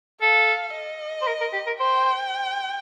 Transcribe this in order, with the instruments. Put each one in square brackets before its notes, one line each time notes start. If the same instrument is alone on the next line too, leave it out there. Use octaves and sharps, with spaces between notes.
[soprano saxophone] A4 [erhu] F5
[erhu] D#5
[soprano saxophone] C5
A#4
A#4
G4
A#4
[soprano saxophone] C5 [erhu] G5